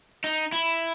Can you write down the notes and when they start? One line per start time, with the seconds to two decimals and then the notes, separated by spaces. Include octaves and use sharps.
0.24 D#4
0.52 E4